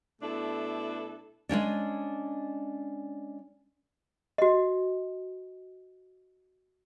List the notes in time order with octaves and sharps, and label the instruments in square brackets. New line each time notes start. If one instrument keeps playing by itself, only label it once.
[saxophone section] B2 A3 D4 E4 A4
[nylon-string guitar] G#3 A#3 C#4 D4
[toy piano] F#4 D#5